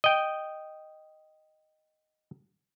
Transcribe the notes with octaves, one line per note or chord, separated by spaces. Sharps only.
D#5 G5